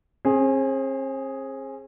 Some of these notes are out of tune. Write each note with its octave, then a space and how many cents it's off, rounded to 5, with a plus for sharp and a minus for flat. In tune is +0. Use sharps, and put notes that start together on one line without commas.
C4 +45 G#4 +0